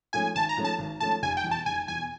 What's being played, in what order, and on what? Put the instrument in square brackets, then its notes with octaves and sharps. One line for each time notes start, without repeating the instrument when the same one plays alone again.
[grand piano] G#2 F3 A3 C#4 [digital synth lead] G#5
[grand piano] G#1 [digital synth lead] A5
[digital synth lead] A#5
[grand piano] G#2 F3 A3 C#4
[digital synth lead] A5
[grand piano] G#1
[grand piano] G#2 F3 A3 C#4 [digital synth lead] A5
[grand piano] F1 [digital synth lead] G#5
[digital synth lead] G5
[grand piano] E2 B2
[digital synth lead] A5
[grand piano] F1 [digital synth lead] G#5
[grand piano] E2 B2 [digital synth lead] G#5